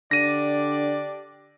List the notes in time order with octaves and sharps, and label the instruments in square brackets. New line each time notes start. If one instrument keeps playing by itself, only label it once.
[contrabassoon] D3 [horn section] D4 G4 D5 [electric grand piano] A#6 D#7